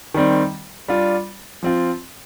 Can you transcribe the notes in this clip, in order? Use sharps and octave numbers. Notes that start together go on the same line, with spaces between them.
D#3 G3 C4
G3 D4 F4
F3 C4 F4